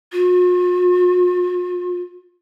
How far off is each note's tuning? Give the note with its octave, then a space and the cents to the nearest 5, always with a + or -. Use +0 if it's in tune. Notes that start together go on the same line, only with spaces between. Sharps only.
F4 +45